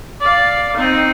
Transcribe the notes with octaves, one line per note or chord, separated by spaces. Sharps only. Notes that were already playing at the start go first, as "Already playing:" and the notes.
D5 F5
C4 D#4